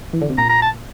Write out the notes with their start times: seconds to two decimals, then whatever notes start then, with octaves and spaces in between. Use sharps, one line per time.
0.13 E3
0.22 D3
0.30 C3
0.38 A#2 A#5
0.50 A#5
0.62 A5